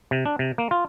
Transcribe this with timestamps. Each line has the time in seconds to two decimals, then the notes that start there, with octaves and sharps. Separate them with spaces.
0.11 C3
0.26 D4
0.39 C3
0.58 A#3
0.71 F4